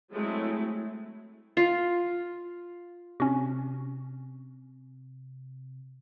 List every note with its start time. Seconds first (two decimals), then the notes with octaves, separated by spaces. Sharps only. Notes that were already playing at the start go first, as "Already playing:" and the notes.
0.11 F#3 G#3 A3 C4 E4
1.57 F4
3.20 C3 C#4 F#4